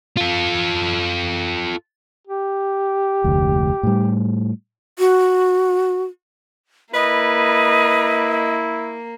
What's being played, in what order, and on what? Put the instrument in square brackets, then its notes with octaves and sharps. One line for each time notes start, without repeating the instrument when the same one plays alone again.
[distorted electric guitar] F4 A4
[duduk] G4
[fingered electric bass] F1 D2
A2 G3
[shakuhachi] F#4
[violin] A#3 [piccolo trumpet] E4 [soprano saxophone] B4 [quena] D#5